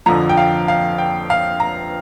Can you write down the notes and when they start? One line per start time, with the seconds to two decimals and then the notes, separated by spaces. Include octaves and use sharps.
0.06 F2 D3 F3 A#5
0.29 G5
0.37 F5
0.68 F5
0.98 G5
1.30 F5
1.60 A#5